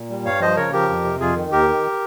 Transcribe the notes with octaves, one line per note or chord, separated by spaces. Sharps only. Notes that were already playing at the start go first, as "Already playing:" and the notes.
Already playing: A#2
G3
G2 C#5 F5
F3 C5 D#5
C#3 A#4 C#5
F3 G4 A#4
F2
C3
F2 F4 G#4
D#3
D#2 G4 A#4
D#3